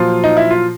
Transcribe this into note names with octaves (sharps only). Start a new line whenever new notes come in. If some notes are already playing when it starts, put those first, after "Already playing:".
Already playing: A#2 F3 F#3 F4
D#4
E4
F4